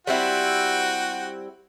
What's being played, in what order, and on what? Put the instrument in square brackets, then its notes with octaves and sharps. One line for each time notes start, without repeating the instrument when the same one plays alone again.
[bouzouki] G3 C4 E4 [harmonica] F#4 G5